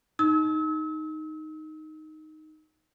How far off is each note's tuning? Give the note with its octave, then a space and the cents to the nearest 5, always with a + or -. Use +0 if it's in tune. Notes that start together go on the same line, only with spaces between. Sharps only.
D#4 +0 E6 -40